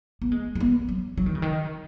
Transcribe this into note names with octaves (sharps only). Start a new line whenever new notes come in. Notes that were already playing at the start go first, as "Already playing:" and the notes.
B3
G#3
G#3
B3
F#3
F#3
D#3
C#3
D#3